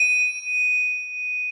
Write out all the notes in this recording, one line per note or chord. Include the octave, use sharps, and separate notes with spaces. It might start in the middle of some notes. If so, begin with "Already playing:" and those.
Already playing: D#7